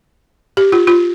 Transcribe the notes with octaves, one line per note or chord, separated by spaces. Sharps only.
G4
F4
F4